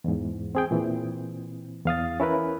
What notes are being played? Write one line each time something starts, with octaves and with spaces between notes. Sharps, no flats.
E2 G#2
C4 G#4 G5
A#2 E3 C4
E2 F5 D#6 A6
C#4 E4 A#4 B4